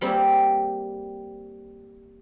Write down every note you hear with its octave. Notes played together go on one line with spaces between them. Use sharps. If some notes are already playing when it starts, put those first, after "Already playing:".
G3 A#3 C4 G#4 E5